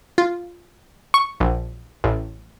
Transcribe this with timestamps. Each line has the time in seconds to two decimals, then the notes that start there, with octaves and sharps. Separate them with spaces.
0.18 F4
1.14 C#6
1.40 A#1
2.04 A1